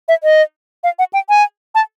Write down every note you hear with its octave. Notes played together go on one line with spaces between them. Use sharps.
E5
D#5
F5
F#5
G5
G#5
A5